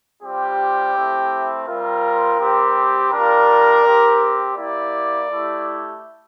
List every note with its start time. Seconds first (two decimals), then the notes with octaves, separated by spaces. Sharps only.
0.22 G3 C4 F4 G4
0.95 A3 C4 E4
1.66 G3 C4 F4 A#4
2.39 G3 C4 G4
3.11 G3 D4 F4 A#4
3.84 C4 G4
4.55 A#3 E4 G4 D5
5.29 A3 E4 G4